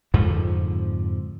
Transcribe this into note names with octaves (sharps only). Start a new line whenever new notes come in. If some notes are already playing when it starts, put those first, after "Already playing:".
F2 G#2 D3 F3